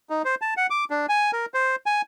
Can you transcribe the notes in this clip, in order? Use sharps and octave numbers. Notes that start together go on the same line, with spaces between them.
D#4
C5
A5
F#5
D6
D4
G#5
A#4
C5
G#5